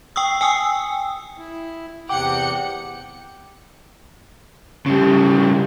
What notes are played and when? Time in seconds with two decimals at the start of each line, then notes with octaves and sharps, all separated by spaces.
0.16 G5 C#6 D#6 E6
0.41 G5 G#5 D#6 E6
1.39 E4
2.09 E2 C3 F#5 G5 D6 G6 C#7
4.86 C#3 G3